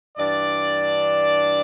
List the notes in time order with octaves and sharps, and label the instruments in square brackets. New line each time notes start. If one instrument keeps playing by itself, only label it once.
[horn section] G2 E3 D4 D5